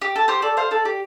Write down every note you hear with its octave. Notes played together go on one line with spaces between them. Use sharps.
G4
A4
G4 C5
A4 D5
C5 F5
A4 D5
G4